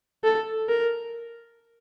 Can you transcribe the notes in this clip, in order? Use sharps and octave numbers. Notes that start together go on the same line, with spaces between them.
A4
A#4